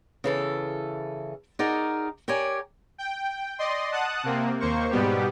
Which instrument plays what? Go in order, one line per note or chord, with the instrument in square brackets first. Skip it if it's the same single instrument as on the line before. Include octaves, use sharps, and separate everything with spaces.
[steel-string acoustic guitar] C#3 E3 A4
D#4 F#4 G#4 A#4 D5
G4 A#4 C#5 D5 G#5
[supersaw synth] G5
D5 D#5 C6
F#5 A5 D#6 F#6
C3 A#3 C4
D#2 A#3 C5 C#6
G#2 B2 G3 B3 G4